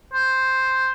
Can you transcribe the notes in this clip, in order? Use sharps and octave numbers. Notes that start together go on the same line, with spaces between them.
C5